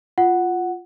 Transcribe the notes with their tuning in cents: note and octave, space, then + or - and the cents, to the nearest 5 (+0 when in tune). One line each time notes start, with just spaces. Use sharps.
F4 +0 F#5 +0